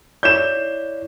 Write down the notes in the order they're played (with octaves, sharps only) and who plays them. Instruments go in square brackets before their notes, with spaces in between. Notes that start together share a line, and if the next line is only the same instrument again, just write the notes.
[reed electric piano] E4 C#5 D5 [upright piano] G6 E7